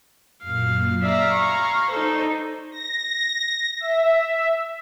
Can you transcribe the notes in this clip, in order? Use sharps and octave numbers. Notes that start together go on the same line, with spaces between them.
F#2 A#2 F5
D5 E5 F5 A#5 E6 C7
B5 C#6 G#6
D#4 A4 C5 D5
A#6
E5